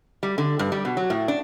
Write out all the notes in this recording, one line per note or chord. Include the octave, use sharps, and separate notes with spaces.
G3
D3
G2
G3
B2
F#3
A2
D4